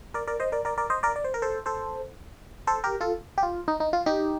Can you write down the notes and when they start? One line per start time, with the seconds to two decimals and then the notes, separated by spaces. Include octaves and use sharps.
0.14 A#4 D5
0.27 A#4 D5
0.40 C5 D#5
0.52 A#4 D5
0.65 A#4 D5
0.78 A#4 D5
0.90 C5 D#5
1.03 A#4 D5
1.16 D5
1.24 C5
1.34 A#4
1.42 A4 C5
1.66 A4 C5
2.67 A4 C5
2.84 G4 A#4
3.01 F4 A4
3.38 G4
3.43 F4
3.68 D#4
3.80 D#4
3.93 F4
4.06 D#4 G4